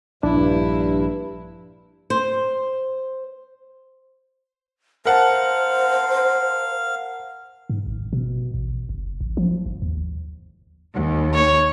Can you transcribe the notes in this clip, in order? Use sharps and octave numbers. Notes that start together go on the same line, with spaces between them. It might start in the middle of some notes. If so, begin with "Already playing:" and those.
A#1 G2 D4 E4
C5
A#4 C5 F5 F#5 A5
G#2
G#1
B2
A1
F#1
A1
F3
G1
D#2
D#2
C#5